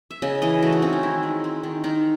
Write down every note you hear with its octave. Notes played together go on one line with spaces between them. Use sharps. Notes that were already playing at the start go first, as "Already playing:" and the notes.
E5
C#3 D#5
E3 D#5
A3 F#4
D#4
C4 C#4
D#4
D#3 E4
G#3
C4
D#3
D#3 D#4